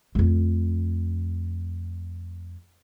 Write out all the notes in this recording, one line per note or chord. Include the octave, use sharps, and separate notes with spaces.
F2 A3